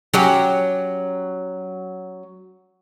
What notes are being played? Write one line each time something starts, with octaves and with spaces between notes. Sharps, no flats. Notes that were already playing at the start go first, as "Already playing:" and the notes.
F#3 C#4 G4